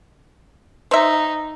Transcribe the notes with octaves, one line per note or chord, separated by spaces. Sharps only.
D#4 C5 E5